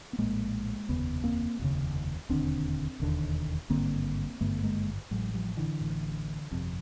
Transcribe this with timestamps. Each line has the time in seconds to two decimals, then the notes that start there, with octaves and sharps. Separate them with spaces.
0.13 B3
0.18 A#1 A2 G#3 A#3
0.89 F1 D#2 C#3 B3
1.24 A#3 C4
1.59 F1 D#2 C#3
2.29 E1 D#2 D3 C4 D4
3.00 E1 D#2 D3
3.70 G#1 G2 D3 A#3 C4
4.40 G#1 G2 D3 A3 B3
4.64 G#3 A#3
5.11 A1 A2 F#3 G#3
5.34 F3 G3
5.57 D3 E3
5.81 A1 A2
6.51 G1 F2 C3